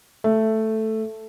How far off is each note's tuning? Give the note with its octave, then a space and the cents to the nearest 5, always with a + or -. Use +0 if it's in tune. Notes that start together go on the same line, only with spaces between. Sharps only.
A3 +0 E5 +10